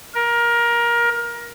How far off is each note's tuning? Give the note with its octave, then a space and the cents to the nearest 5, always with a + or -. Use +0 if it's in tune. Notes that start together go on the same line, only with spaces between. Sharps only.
A#4 +20